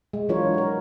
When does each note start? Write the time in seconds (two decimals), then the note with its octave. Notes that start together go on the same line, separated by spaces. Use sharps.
0.13 G#3
0.29 E3 F#3 D4 F4 A#4 C#5
0.54 F#4 A#4